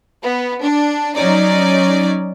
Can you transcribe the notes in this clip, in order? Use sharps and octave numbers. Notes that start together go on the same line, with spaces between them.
B3
D4
F#3 C#4 D#4 D5